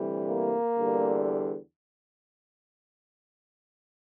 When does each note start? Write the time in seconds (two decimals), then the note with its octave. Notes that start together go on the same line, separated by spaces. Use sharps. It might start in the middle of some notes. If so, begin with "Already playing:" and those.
Already playing: D2 C3 E3 G3
0.26 A#3
0.76 E2 D3 G3